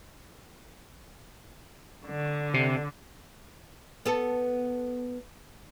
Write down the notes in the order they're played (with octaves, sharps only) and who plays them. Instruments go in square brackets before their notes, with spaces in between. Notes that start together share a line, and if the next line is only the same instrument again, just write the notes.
[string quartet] D3
[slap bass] C3
[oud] B3 A4